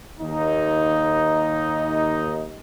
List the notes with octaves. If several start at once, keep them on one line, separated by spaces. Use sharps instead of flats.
D#2 D#4